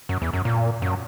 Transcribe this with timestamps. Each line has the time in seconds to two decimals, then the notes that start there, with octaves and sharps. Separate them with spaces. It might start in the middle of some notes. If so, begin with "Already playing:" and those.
0.09 F#2
0.22 E2
0.33 F#2
0.45 A#2
0.82 F#2